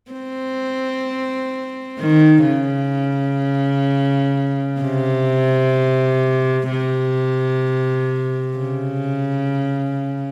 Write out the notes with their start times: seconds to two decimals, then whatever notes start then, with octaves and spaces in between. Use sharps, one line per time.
0.11 C4
1.99 D#3
2.46 C#3
4.81 C3
6.70 C3
8.58 C#3